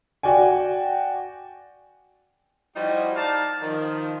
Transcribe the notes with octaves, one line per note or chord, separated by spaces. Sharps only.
F#4 D5 G5 G#5
F3 G3 D#4 E4 F#4
D#4 D5 F5 A5
D#3 F3